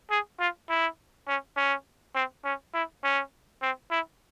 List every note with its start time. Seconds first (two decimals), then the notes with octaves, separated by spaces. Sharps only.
0.10 G#4
0.39 F4
0.69 E4
1.28 C#4
1.56 C#4
2.15 C4
2.45 C#4
2.74 E4
3.03 C#4
3.62 C4
3.91 E4